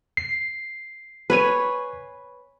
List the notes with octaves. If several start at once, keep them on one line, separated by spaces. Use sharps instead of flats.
C7
B4 C#5 G#5